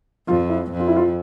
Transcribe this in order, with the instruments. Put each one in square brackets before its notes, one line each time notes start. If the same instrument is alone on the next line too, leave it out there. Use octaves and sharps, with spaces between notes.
[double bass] F2 [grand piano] F4
[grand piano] E4
[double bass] F2
[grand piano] F4
E4
F4